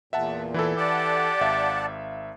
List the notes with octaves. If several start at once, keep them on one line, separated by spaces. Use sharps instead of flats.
E2 A#2 E5 F#5 A5
E3 E4 A4
G4 D5 F#5 A5
G#1 E5 F5